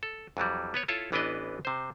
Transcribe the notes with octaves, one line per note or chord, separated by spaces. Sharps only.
A4
F2 E3 F#3 G3
B3 B4 C#5
E4 F4 A4 C#5 E5
A1 E3 B3 D4 B4 D#5
C3 C5